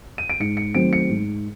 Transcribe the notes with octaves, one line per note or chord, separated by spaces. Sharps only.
D#7
D7
G#2 C#7
C#7
D#3 F#3 A3 C4 D7
C#7
G#2